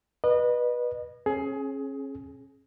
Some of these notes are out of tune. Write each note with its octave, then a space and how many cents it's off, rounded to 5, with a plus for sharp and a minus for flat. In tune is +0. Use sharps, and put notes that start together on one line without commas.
B4 -20 D#5 -35
C#4 -35 G#4 +20